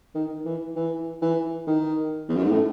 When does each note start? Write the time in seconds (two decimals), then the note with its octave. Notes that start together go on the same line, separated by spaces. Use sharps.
0.15 D#3
0.45 E3
0.76 E3
1.22 E3
1.67 D#3
2.29 E2
2.36 F#2
2.43 G#2
2.51 A2